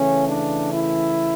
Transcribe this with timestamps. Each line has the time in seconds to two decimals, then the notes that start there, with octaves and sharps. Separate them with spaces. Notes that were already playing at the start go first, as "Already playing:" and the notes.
Already playing: C#3 E3 A3 C#4
0.28 D4
0.74 E4